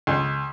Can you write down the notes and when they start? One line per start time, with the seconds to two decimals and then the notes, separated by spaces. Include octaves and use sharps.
0.07 C#2